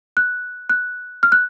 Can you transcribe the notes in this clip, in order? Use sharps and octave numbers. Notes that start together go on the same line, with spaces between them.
F#6
F#6
F6
F#6